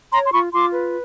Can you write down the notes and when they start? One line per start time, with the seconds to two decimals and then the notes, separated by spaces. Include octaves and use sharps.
0.12 C#5 A#5 C6
0.25 C6
0.33 F4 B5 C#6
0.53 F4 C6 D6
0.73 B4